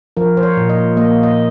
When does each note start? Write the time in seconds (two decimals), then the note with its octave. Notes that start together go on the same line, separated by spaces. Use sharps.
0.17 F3 A#4
0.37 C5
0.43 C#5
0.57 A#2
0.69 D#5
0.97 A#3 D#5
1.23 D#5